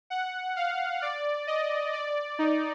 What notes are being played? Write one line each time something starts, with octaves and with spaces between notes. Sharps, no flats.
F#5
F5
D5
D#5
D5
D#4